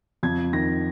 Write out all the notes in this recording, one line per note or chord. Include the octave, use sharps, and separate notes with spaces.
F2 G#6
D#3 A#6